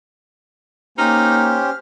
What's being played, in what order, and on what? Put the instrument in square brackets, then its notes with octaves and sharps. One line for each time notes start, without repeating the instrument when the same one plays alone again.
[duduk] A#3 [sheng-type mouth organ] C#4 G4 C5 [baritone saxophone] D#4 [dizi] F6